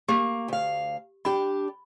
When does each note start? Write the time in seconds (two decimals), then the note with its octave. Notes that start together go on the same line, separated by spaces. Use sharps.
0.08 A#3 G4
0.48 D2 F5
1.25 D4 G4 B5